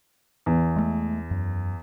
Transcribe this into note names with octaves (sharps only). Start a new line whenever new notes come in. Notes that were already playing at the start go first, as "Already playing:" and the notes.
E2
G#3 A3
F#2